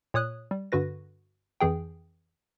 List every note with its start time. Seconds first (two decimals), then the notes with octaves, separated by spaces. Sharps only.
0.14 A#2 C#5 D#6 F#6
0.51 G3
0.72 G2 D3 F#4 B4 A#6
1.60 F2 E3 G#4 G5